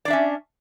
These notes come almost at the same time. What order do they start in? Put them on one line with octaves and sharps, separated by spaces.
D5 D4 E5 C#4